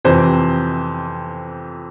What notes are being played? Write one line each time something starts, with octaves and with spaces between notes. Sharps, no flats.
F2 C3 E3 C5